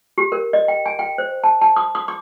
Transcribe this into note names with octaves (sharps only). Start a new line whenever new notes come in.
G4
A#4
D#5
G5
G#5
G5
C5
A5
A5
D#6
D#6
D6